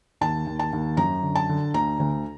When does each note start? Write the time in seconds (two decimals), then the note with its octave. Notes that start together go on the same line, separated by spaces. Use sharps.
0.21 D#2 A5
0.47 D#2
0.59 A5
0.73 D#2
0.97 F#2 A#5
1.23 D3
1.35 A5
1.49 D3
1.74 D2 A#5
2.00 D2